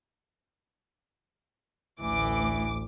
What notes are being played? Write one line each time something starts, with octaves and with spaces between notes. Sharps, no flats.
A1 D2 E3 D6